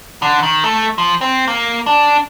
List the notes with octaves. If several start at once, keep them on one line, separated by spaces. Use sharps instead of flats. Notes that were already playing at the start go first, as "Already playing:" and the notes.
D3
D#3
A3
F3
C4
A#3
D4